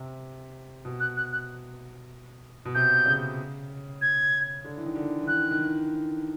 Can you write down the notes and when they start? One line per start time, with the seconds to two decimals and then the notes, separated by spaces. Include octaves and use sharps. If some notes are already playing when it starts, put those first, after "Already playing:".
Already playing: C3
0.85 B2
1.00 F#6
1.17 F#6
1.32 F#6
2.65 B2
2.75 C3 G6
3.06 C#3
4.02 G#6
4.64 D3
4.77 E3
4.86 D#3
4.96 D3
5.21 E3
5.27 D#3 F#6
5.51 D#3
5.59 E3